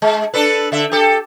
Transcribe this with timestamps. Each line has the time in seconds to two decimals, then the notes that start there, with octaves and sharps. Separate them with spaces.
0.02 G#3
0.34 D4 A4 B4
0.72 D3 E5
0.92 G4 A4